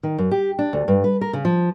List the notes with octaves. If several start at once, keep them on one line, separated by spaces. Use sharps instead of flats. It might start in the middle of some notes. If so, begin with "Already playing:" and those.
D#3
F#2
G4
D4
D2
G2
B4
A#4
C#3
F3